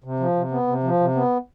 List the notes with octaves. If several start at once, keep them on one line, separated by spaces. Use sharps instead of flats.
C3
F3
C3
B3
C3
F3
C3
B3